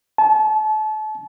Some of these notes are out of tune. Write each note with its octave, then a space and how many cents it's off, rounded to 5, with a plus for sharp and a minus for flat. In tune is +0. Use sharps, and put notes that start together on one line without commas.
A5 -35